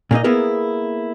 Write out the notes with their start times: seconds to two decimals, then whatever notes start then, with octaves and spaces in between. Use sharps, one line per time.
0.11 A#2 A#3 D#4 D#5
0.24 A#3 B3 E4 G#4 A#4